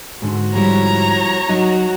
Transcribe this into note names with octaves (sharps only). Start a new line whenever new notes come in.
G#2 D3 F#4
F3 G3 E4 C#5 A#5
F#3 D#4 F#4